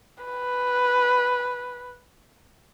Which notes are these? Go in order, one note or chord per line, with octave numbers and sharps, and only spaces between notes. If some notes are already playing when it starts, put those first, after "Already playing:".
B4